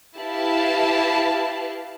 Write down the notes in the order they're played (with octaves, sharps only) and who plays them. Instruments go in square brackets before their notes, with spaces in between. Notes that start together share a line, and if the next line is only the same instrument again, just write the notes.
[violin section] E4 G4 B4 F5 A5